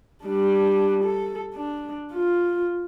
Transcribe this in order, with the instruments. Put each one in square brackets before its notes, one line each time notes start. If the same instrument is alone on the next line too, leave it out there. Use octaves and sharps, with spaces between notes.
[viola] G3 D4
A4
D4
F4